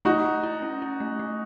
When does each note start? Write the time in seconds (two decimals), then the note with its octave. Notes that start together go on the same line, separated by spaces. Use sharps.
0.05 A3 D#4 F#4
0.24 A3
0.43 E4
0.62 C#4
0.82 E4
1.00 A3
1.19 A3